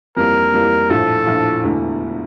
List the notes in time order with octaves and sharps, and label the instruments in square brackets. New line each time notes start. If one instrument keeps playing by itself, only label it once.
[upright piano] F2 E3 G3 A#3 [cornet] A#4
[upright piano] F2 E3 G3 A#3
[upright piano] A#1 A2 F3 [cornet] A4
[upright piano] A#1 A2 F3
E1 E2 D3 A3